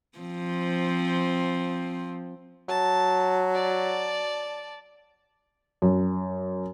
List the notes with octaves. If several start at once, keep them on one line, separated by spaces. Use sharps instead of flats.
F3 C4
F#3 A5
D5 A5
F#2